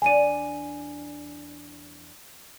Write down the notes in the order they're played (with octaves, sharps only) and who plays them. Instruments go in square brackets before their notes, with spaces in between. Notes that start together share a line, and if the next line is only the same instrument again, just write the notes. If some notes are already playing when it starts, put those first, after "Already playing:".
[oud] E2 D4 D5 [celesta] G#5 D#7